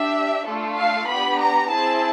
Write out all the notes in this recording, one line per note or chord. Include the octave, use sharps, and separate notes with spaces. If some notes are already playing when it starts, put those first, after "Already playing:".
Already playing: D4 G4 E5
A3 D4 F4 A4
F5
B3 D4 G4 B5
A#5
C4 E4 G#4 A5